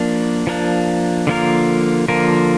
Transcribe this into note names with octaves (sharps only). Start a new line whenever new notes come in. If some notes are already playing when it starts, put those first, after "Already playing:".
Already playing: F3 A#3 D4
F3 A#3 D4
D3 F3 A#3 F4 A#4
D3 F3 A#3 F4 A#4